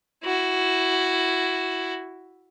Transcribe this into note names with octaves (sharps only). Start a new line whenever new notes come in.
E4 F#4